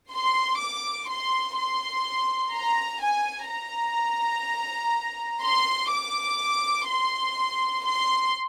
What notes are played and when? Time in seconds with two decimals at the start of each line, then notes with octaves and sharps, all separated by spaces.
0.12 C6
0.60 D6
1.09 C6
1.57 C6
2.53 A#5
3.02 G#5
3.49 A#5
5.43 C6
5.91 D6
6.88 C6
7.84 C6